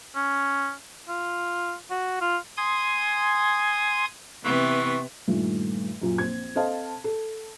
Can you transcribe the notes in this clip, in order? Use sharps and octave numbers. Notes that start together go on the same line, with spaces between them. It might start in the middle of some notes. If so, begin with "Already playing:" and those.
C#4
F4
F#4
F4
G#5 C6 D#6 G#6
C3 E3 B3 C#6
G2 A#2 D#3 A3
F#2 A#2
A#1 C4 G#6
C4 A4 C5 D#5 F5 A5
A4